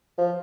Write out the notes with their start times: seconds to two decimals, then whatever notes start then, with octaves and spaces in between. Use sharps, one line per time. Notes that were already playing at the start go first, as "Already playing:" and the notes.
0.18 F3